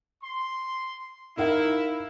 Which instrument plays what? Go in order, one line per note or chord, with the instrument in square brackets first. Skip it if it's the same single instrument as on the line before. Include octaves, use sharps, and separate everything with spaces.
[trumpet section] C6
[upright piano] D#4 A#4 F5 [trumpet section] E4